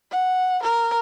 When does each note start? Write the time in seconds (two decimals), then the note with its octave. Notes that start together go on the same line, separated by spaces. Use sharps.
0.11 F#5
0.63 A#4